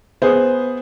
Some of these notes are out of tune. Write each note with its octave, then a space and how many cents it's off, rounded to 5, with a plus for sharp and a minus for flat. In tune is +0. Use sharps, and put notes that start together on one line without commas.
B3 +0 G#4 +0 C5 +0